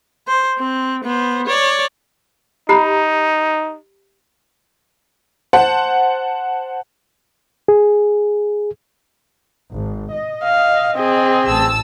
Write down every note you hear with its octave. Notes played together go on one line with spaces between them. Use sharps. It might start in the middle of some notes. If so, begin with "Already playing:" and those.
C5
C4
B3 C5
C#5 D5
D#4 G4 A#5 B5
C5 F#5 A5
G#4
G#1
D#5
F5
C4 G#4
A1 A5 E6